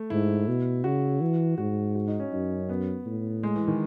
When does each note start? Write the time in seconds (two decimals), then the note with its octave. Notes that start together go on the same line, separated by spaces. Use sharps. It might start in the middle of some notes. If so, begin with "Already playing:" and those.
Already playing: A3
0.10 G#2 E4
0.48 B2
0.84 C#3 F#4
1.21 E3
1.58 G#2 F#4
1.95 F#4
2.08 D#4
2.20 C#4
2.32 F#2 D#4
2.69 B3
3.06 A2
3.43 G#3
3.56 E3
3.68 D#3